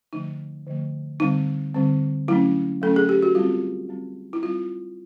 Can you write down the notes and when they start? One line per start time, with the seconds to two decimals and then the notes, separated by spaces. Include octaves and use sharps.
0.13 D3 F3 A3 D#4
0.66 D3 F3 A3
1.20 D3 G3 C4 D#4
1.74 D3 G3 C4
2.28 F#3 A3 C#4 E4
2.81 F#3 A3 C#4 A4
2.96 G#4
3.09 G4
3.22 F#4
3.35 G3 C4 F4
3.89 G3 C4
4.33 E4
4.43 G3 C4 F4